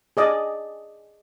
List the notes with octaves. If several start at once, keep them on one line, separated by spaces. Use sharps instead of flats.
G#4 D5 D#5